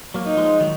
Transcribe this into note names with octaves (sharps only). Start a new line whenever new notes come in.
F#3 A#3
D#4
F3 G#3
D#3 F#3